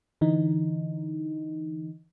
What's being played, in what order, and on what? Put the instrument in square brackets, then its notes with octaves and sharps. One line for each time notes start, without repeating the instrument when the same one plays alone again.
[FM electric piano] D3 E3 D#4